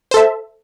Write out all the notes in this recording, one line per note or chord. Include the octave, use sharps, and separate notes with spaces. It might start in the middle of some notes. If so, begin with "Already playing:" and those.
A4 C5 E5